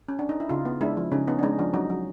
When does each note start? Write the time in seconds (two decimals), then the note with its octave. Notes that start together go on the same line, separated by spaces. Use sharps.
0.08 C#4
0.19 D4
0.29 D#4
0.40 E4
0.49 C#3 D#4 F4
0.65 B3
0.81 G#3 D4 E4
0.97 F3
1.12 C#3 C#4 D#4
1.28 B3 C#4 D#4
1.39 D4
1.43 G#3 C#4 D#4
1.59 F3 D4
1.73 F#3 C#4 D#4
1.90 F#3